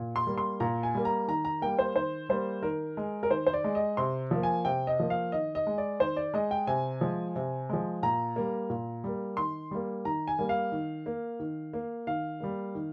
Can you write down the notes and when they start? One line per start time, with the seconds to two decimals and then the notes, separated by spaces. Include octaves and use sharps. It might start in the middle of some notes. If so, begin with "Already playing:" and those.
Already playing: A#2
0.16 C6
0.27 G3 A#3
0.38 C6
0.60 A#2 A#5
0.83 G#5
0.94 G3 A#3
1.05 A#5
1.28 D#3 A#5
1.45 A#5
1.62 G3 A#3 G5
1.79 C5
1.96 D#3 C5
2.29 G3 A#3 C5
2.62 D#3 A#4
2.97 G#3
3.23 A#4
3.31 D#3 C5
3.47 C5
3.53 D5
3.64 G#3
3.75 D#5
3.97 C3 C6
4.31 F3 A#3
4.43 G#5
4.65 C3 G5
4.87 D#5
5.00 F3 A#3
5.10 F5
5.32 D#3 D#5
5.55 D#5
5.67 G#3
5.78 D5
6.00 D#3 C5
6.16 D5
6.34 G#3 D#5
6.51 G5
6.67 C3 G#5
7.01 F3 G#3
7.36 C3
7.69 F3 G#3
8.03 A#2 A#5
8.36 G3 A#3
8.70 A#2
9.04 G3 A#3
9.37 D#3 C6
9.71 G3 A#3
10.05 D#3 A#5
10.28 G#5
10.39 G3 A#3
10.49 F5
10.72 D#3
11.06 A#3
11.40 D#3
11.74 A#3
12.07 D#3 F5
12.40 G3 A#3
12.75 D#3